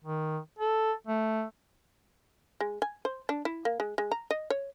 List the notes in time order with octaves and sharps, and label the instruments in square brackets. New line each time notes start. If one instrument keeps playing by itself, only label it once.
[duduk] D#3
A4
A3
[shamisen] G#3
G#5
C5
D4
E4
A#3
G#3
G#3
A#5
D#5
C#5